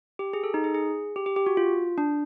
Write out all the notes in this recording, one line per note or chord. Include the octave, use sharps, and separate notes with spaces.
G4
G#4
A4
D#4
G#4
G#4
G4
G4
G4
F#4
F4
D4